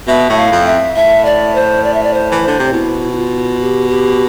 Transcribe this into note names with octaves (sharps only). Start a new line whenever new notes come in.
B2 E5
A2
F5
F2
E5
A2 E5
D5
C5
D5
E5
D5
C5
E3
D3 C5
C3
B2 E4
E4
F4
G4
G4